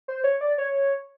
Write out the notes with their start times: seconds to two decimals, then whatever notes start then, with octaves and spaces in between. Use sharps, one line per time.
0.08 C5
0.24 C#5
0.41 D5
0.58 C#5